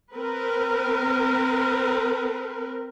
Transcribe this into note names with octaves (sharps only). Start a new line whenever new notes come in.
C4 A#4 B4